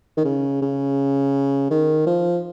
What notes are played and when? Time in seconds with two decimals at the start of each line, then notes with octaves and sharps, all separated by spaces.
0.17 D#3
0.25 C#3
0.62 C#3
1.71 D#3
2.07 F3